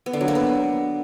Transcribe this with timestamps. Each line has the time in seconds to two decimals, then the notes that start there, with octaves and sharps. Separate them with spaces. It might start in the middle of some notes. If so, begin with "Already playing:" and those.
0.06 B3
0.13 D3
0.21 F#3
0.28 A#3
0.35 B3